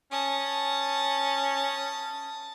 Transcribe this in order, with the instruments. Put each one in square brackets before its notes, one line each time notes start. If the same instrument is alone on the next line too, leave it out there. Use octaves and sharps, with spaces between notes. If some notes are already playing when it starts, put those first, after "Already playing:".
[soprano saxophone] C#4 [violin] A5 D#6